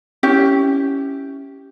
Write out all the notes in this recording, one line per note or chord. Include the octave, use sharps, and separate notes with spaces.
C#4 E4 G4